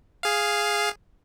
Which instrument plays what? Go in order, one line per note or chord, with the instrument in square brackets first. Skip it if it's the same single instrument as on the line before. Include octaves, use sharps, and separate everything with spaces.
[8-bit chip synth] G#4 F5